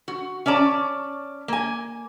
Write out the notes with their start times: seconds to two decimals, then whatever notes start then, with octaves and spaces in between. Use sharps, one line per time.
0.08 F#4
0.46 C#4 C#5 D5 A5
1.48 A#3 G#5